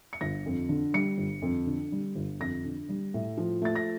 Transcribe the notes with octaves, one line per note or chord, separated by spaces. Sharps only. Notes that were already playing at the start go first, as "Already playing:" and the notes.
C#7
G1 A#6
F2
D3
G3 C#7
G1
F2
D3
G3
G1
F2 A#6
D3
G3
A2
F3
A3 A6
A#6